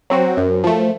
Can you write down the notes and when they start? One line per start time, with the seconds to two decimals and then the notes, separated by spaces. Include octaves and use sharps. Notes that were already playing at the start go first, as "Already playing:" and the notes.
0.10 F#3 C4 F#4
0.37 F#2
0.64 F3 A3